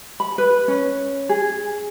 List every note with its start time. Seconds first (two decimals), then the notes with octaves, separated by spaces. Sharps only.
0.20 B5
0.38 B4
0.68 C#4
1.29 G#4